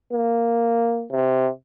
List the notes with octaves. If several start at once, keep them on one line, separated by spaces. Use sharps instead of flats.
A#3
C3